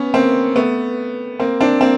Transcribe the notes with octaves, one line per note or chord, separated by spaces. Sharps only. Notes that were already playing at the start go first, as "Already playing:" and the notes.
Already playing: B3 C#4
A#3 C4
A3 B3
A#3 C4
C4 D4
A#3 C4